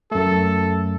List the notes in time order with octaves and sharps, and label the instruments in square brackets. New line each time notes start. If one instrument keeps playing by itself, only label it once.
[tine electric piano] F#2 A3 [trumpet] A4